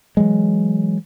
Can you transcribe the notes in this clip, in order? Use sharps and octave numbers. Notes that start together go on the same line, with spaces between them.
E3 F#3 G#3